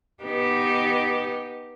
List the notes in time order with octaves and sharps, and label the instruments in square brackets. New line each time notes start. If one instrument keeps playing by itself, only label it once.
[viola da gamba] B3 D#4 G4